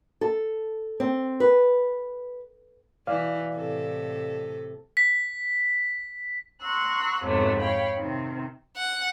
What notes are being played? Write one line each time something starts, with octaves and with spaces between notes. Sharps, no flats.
A4
C4
B4
B2 E3 E4 D5 F5
A2 C3 A4
B6
F#5 A#5 C6 C#6 E6 F#6
F2 G#2 C3 F#3 A3 B3
C#5 F5 G5 B5
C3 D#3 C4
F#5